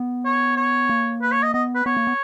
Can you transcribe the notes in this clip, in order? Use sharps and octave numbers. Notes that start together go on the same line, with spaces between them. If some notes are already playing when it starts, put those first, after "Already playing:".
Already playing: B3
C#5
C#5
A#3
B4
C#5
D#5
B3 D#5
B4
B3 C#5
A#3
B3